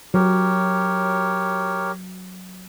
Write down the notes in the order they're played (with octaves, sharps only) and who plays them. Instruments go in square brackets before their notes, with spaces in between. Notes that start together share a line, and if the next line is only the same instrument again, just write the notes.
[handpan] F#3 [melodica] G4 A#4 C#5